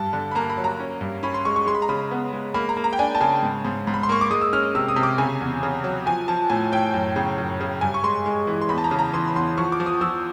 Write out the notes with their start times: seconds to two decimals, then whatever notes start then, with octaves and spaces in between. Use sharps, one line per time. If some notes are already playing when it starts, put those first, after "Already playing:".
Already playing: G2 A5
0.13 D3
0.31 B5
0.35 A#3 A#5
0.50 B5
0.57 F#3
0.64 A#5
0.79 C#4
1.01 G2
1.23 C#4 B5
1.34 C6
1.45 G#3 C#6
1.56 C#6
1.66 G#3 C6
1.75 B5
1.82 A#5
1.89 C#3 B5
2.11 B3
2.33 G#3
2.54 A#3 B5
2.69 A#5
2.77 A#3
2.84 A#5
2.93 G5
2.99 D4 G#5
3.15 A5
3.20 C#3 G#5
3.43 G#2
3.65 G#2
3.87 G#2
3.94 B5
4.03 C6
4.09 A#3 C#6
4.21 D6
4.31 G#3 D#6
4.41 E6
4.53 C#4 F6
4.75 C3 E6
4.88 D#6
4.96 C3
5.03 D6
5.18 C#3 G#5
5.41 E2
5.63 C#3
5.84 F#3
6.06 F3 G#5
6.28 F3 A5
6.50 A2 G#5
6.72 A2 G5
6.94 F#2
7.16 C#3
7.38 F#2
7.60 C#3
7.81 G2 G#5
7.94 C#6
8.04 G#3 C6
8.26 G#3
8.47 E3
8.61 C6
8.69 E2 B5
8.78 A5
8.84 A#5
8.91 C#3
8.99 A#5
9.13 E3 C6
9.28 B5
9.36 E2 C6
9.57 F3 C#6
9.72 D6
9.80 F3
9.86 D#6
10.01 F3 E6